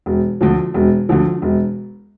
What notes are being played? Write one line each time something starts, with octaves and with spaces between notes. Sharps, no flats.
E1
D2 D3 F3
E1
D2 D3 F3
E1